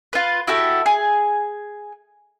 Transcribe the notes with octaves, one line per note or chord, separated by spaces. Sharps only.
F4 B4
E4 F#4 G4 A4
G#4